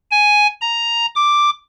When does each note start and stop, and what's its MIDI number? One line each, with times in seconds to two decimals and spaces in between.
0.11 0.47 80
0.61 1.06 82
1.16 1.50 86